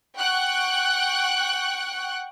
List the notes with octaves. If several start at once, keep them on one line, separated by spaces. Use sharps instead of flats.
F#5 G5 C#6 F#6